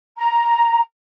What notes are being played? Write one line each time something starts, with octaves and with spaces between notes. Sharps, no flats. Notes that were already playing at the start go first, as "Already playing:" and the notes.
A#5